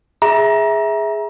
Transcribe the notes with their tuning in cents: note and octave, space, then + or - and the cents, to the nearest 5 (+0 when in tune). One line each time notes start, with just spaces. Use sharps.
G#4 +0 E5 -10 A#5 +30